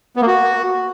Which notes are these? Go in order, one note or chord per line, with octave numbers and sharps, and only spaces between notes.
B3
A#3
F#4